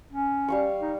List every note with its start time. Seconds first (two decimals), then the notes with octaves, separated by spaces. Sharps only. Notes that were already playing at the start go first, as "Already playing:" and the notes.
0.12 C#4
0.48 G3 F5 C#6
0.80 D#4